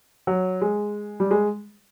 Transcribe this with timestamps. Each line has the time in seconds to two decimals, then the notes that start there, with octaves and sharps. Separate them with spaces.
0.27 F#3
0.61 G#3
1.20 G3
1.31 G#3